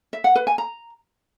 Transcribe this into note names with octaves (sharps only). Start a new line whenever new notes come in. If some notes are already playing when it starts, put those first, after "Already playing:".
E5
F#5
B4
G#5
A#5